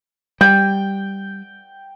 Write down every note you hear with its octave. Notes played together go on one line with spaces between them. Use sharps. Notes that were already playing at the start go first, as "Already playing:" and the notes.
G3 G5